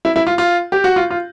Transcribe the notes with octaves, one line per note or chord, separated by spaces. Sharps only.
E4
E4
F4
F4
G4
F#4
F4
F4